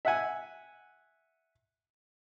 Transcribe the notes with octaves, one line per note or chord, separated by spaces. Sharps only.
E5 F#5 G#5